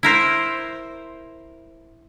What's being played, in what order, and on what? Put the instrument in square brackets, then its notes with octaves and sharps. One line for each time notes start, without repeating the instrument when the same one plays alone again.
[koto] E4 A#4 C5